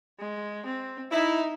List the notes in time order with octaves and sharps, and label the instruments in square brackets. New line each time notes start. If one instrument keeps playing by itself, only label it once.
[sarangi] G#3
C4
[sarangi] D#4 [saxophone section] E4